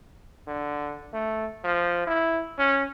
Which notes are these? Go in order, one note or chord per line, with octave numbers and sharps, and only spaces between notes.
D3
A3
F3
E4
C#4